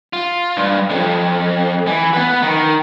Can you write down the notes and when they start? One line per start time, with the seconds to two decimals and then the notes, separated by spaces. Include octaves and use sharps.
0.13 F4
0.57 G2
0.90 C2 F2
1.87 E3
2.14 B3 B4
2.43 D#3